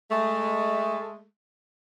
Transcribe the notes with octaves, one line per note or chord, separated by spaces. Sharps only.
G#3 A3